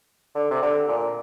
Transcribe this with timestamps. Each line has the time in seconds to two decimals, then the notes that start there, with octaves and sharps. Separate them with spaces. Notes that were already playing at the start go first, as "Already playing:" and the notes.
0.35 D3
0.51 C3
0.63 D3
0.88 A#2